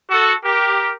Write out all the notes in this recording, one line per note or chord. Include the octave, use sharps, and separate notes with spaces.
F#4 A4
G4 A#4